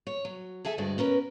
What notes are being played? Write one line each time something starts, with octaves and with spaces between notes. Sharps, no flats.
C#5
F#3
G#4 A4 E5 G#5 A5
D2 G2 G#3 F#4 D5
B3 C#4 A#4 B4